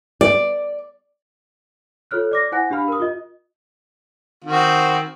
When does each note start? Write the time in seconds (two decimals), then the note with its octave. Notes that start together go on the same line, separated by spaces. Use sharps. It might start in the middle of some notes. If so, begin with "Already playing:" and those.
0.21 D5
2.11 F4 A4 C#5 F6 F#6
2.31 D5 D6 A#6
2.52 E4 C5 F#5 G#5 F#6 A#6
2.70 D4 G4 F5 B5 F6
2.88 A#4 D#6
3.00 F4 D#5
4.44 D#3 C4 F#4